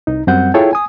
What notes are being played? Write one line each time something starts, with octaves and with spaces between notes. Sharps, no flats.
C2 D#4
F#2 G3 C4 F#5 G6
E4 F4 G#4 A4 C#5 G5
G#5 D#6